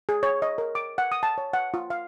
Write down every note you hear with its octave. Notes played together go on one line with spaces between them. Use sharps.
G#4
C#5
D#5
A#4
D6
F#5
D#6
A5
C#5
F#5
F4
F5